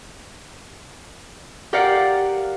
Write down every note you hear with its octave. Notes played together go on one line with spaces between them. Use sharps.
G4 A#4 D5 F5 F#5